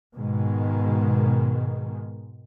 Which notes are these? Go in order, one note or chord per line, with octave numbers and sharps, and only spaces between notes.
G#2 B2 D#3 G#3